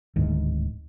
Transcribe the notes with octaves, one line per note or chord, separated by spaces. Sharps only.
D1 D2 G#2 D#3